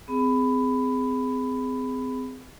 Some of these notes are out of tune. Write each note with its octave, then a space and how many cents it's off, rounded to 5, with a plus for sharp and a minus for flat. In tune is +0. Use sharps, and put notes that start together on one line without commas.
C4 -35 G#4 +0 B5 +15